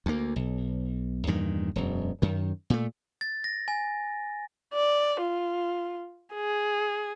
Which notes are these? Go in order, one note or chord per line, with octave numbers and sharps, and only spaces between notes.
D2 A#3
B1
E2 G2 A#2 D#3
E1 F#2
F#2 D#3
A#2 A3
A6
A#6
G#5
D5
F4
G#4